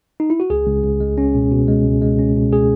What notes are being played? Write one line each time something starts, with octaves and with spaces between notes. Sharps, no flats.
D#4
E4
F#4
C#2 G#4
C#2
C#2
G#3
C#4
B2
B2
G#3
C#2
G#3
C#4
B2
G#4